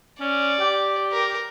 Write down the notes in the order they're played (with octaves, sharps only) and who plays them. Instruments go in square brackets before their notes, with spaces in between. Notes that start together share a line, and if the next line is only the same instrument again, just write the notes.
[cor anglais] C#4 [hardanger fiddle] D5
[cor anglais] G4
[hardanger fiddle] A#4